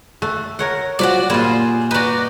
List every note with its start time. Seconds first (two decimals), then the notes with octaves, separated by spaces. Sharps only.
0.22 A3 F#6
0.59 A#4 C#5 F#5
0.99 F#3 F4 F#4 B4 C5 D5
1.30 A#2 G3 A#3 F4 G#4 C5
1.91 D#4 F#4 B4 D5